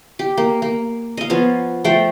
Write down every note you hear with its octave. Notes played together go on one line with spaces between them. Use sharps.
G4
A#3
A#3
D#5 F5
F3 B3 F4 C#5
F3 A3 C5 G5